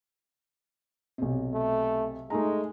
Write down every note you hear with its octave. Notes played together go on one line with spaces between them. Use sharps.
B1 C3
A3
G#3 A3 D#4 A#5